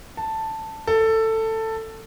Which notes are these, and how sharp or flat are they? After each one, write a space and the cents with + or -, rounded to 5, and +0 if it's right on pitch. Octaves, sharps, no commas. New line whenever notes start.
A5 +5
A4 +15